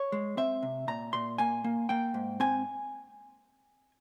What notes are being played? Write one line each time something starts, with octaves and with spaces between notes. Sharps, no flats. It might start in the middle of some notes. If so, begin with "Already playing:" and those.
Already playing: C#5
G#3
C4 E5
C3
A#2 A#5
A#2 C6
A#3 G#5
A#3
A#3 G5
G#2
C4 G#5